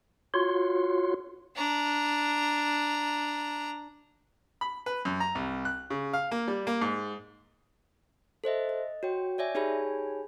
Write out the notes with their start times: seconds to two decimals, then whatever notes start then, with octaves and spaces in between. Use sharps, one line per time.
0.34 F4 F#4 C#5 C6
1.56 D4 A#5
4.61 B5
4.86 B4
5.05 F#2
5.20 A#5
5.35 C2
5.65 F#6
5.90 C#3
6.13 F5
6.31 A#3
6.48 G3
6.67 A#3
6.82 G#2
8.44 A4 C5 D#5 E5
8.69 D#5
9.03 F#4 C#5 G5
9.38 C#5 D5 E5 G#5
9.55 D#4 G4 G#4 C#5 G#5 B5